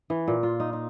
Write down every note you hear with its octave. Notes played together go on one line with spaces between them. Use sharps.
E3
A#2
F4
D#4
D#4